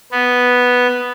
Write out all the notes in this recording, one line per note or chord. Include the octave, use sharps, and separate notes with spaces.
B3